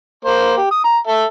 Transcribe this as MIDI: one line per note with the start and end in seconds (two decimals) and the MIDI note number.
0.25 0.57 58
0.25 0.57 72
0.57 0.70 67
0.71 0.82 87
0.84 0.98 82
1.07 1.24 69
1.07 1.24 76